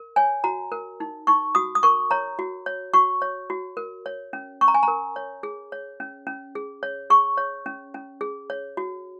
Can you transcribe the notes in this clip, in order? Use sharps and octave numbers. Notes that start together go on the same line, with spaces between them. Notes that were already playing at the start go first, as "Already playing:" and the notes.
Already playing: A#4
C#5 G#5
F#4 A#5
A#4
D#4
D#4 C#6
F#4 D#6
D#6
A#4 C#6
C#5 A#5
F#4
C#5
F#4 C#6
C#5
F#4
A#4
C#5
C#4
C#4 C#6
A#5
G#5
A#5
A#4
C#5
G#4
C#5
C#4
C#4
G#4
C#5
G#4 C#6
C#5
C#4
C#4
G#4
C#5
F#4